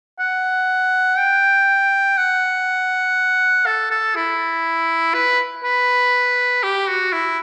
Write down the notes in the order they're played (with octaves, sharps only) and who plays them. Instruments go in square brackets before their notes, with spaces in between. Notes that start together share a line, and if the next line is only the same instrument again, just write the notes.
[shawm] F#5
G5
F#5
A4
A4
E4
B4
B4
G4
F#4
E4